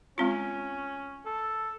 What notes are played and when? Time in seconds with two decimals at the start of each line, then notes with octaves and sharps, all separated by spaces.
0.18 G#3 C4 C#4 F4
1.26 A4